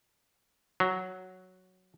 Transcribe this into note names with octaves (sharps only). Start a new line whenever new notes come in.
F#3